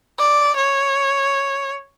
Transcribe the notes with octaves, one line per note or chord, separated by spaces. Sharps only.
D5
C#5